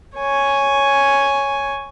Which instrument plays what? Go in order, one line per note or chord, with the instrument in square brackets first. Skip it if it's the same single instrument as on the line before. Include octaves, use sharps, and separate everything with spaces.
[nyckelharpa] C#5 G#5